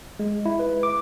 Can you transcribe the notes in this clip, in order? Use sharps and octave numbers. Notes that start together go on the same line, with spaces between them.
G#3
E4
B4
D6